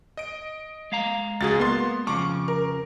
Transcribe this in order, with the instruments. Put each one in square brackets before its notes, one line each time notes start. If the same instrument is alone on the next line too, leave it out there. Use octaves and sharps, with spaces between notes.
[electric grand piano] D#5 D7
[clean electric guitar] G#3 F5 A#5
[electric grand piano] C#2 F#4 G#4 [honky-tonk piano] A6
[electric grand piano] A#3 [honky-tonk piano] B3 C6
[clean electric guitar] F2 C#3 F3 [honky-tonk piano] C#6 [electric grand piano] D6
[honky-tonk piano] A#4